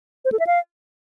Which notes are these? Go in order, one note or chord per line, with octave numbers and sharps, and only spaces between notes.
C5
A4
E5
F5